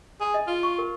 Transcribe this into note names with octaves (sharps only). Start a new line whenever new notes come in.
G#4
D#5
F4
C#6
A#4